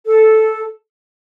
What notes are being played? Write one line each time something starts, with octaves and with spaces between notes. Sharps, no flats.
A4